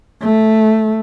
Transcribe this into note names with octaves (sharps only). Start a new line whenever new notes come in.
A3